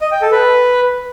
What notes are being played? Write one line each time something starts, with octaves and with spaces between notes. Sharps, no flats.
D#5
G5
A4
B4